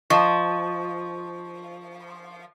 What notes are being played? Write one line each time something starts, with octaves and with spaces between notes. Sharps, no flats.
F3 D#5 F5 A5 C#6